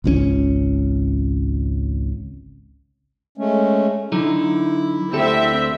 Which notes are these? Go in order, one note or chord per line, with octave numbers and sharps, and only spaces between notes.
G#1 C#2 D3 C#4
G#3 A3 C#4
D3 F#3 D#4 E4
D2 C4 G4 A4 E5